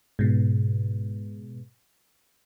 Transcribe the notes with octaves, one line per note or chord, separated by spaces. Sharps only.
G#2 B2